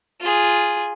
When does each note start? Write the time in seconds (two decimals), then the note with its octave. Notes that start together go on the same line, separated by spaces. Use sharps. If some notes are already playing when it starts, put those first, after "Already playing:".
0.21 F4 G#4